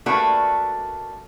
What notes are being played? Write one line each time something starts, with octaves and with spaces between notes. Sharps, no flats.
A3 A#3 D4 F#4 A4 B4